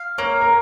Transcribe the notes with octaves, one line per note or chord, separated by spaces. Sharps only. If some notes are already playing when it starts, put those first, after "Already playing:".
Already playing: F5
A#3 C#5
A#4